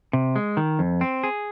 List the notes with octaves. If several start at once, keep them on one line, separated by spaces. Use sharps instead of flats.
C3
G#3
D#3
F2
C4
G#4